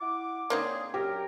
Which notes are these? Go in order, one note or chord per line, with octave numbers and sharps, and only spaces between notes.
E4 F#5 D6
C#3 A#3 C4 D4 D#4 G#4
F#2 G4 A#4